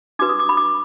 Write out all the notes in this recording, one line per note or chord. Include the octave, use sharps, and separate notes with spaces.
D4 F#4 B4 D6
D#6
D6
B5
D6